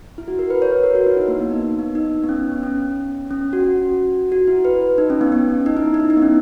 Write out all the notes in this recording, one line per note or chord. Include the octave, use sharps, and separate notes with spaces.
E4
F#4
A#4
B4
C#5
B4
A#4
F#4
E4
D#4
A#3
B3
D#4
B3
D#4
B3
C#4
B3
C#4
C#4
F#4
F#4
F#4
E4
B4
D#4
C#4
B3
B3
C#4
D#4
E4
D#4
E4
D#4
B3
C#4